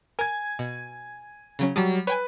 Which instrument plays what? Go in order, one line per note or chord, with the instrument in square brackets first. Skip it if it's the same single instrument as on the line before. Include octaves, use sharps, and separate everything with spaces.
[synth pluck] A#4 [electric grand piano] G#5 G#6
[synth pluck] B2
C#3 F#3 C#4
[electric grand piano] F#3 G3 [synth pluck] A5 D6 D#6
[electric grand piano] B4 [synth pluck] C#5 G5 G#5